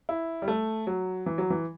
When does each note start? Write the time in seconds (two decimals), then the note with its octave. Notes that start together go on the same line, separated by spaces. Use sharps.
0.09 E4
0.42 G3
0.48 A3
0.87 F#3
1.26 E3
1.38 F#3
1.50 E3